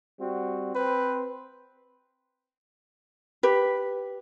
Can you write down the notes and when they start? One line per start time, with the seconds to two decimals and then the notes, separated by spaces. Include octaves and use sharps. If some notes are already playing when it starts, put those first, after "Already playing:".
0.19 G3 C4 F#4
0.75 C4 B4 C5
3.43 G4 B4